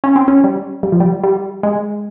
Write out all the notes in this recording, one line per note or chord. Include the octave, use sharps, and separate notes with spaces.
C#4
C4
C#4
G3
G3
F3
G3
G3
G#3